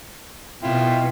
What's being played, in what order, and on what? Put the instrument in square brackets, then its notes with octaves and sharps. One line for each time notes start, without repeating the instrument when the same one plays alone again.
[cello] B2 [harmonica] E4 F4 G5